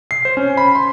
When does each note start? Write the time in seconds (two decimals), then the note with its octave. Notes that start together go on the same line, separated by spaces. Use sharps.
0.11 C7
0.25 C5
0.37 C#4
0.57 B5
0.75 C6